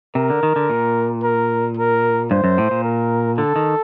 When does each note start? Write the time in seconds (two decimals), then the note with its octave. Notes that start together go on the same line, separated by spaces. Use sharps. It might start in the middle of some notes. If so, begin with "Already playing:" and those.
0.15 C3 A#4
0.30 D3
0.43 D#3
0.56 D3
0.70 A#2
1.23 A#4
1.77 A#4
2.31 G2 C5
2.44 F#2
2.58 A2
2.71 A#2
2.84 A#4
3.38 D3 A4
3.56 D#3